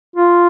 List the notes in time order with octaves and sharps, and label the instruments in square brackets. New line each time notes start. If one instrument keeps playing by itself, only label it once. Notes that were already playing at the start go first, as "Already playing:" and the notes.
[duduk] F4